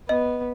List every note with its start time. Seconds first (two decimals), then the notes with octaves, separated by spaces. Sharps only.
0.09 B3 D#5